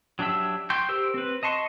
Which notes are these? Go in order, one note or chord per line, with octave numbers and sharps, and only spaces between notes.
F#3 D4 G4 E5 E6
G5 C6 C#6 G6
G4 A#4 C5 E6
C4 B4
D#5 A5 C6 C#6